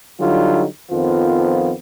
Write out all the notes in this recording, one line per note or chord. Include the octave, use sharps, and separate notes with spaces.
D3 F#3 G3 D#4 F4
F2 D#3 F3 B3 F4